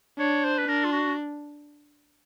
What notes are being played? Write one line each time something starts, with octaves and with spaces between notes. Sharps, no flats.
D4 C#5
C5
B4
D4 A#4
F4
F#4